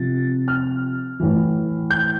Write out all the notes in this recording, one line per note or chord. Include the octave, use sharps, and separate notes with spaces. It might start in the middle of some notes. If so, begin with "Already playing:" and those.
Already playing: C3 F3 A6
F6
A2 E3
G6